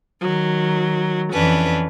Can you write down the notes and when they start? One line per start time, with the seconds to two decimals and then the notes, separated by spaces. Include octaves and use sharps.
0.22 D#3 F#3
1.32 F2 E3 C#4 D4 B4